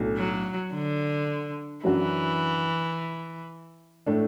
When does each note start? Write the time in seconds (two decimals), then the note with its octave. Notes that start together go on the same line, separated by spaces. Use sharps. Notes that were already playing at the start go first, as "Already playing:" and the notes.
Already playing: B1 A2 A3 D4
0.17 F#3
0.73 D3
1.84 F#2 E3 F#3 D4 F#4
4.07 A2 A3 D4